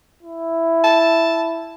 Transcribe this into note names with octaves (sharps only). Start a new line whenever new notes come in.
E4
A5